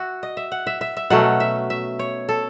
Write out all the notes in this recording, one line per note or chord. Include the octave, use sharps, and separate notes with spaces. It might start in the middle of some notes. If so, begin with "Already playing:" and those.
Already playing: F#4 E5
D#5
E5
F#5
E5
E5
E5
B2 F#3 A3 C#4 F#5
E5
E5
C#5
A4